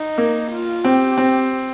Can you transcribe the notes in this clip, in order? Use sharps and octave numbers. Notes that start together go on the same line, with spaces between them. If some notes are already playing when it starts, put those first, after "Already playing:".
Already playing: D#4
A#3
F4
C4 G4
C4